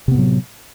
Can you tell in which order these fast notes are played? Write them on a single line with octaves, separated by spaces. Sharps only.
C3 B3 A2 F#3